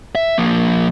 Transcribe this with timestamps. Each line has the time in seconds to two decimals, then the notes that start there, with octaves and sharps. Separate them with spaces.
0.15 E5
0.38 F3 A#3